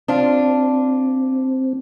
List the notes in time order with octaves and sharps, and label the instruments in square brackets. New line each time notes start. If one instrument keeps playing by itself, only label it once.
[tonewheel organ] C4 [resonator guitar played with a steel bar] D4 F4